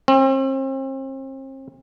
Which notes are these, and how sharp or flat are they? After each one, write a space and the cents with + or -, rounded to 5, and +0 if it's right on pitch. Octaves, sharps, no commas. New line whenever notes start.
C4 +40